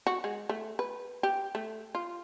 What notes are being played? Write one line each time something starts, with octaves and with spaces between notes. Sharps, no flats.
F#4
G#3
A3
B4
G4
A3
F4